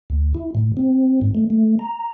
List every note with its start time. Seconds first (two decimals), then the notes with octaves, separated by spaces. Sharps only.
0.10 D2
0.35 E4
0.55 A2
0.77 C4
1.21 G#2
1.35 A3
1.50 A3
1.79 A#5